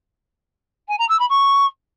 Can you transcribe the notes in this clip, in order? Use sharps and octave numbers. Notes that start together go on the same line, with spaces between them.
G#5
A#5
E6
B5
C#6